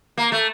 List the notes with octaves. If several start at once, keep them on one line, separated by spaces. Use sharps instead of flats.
A#3
A3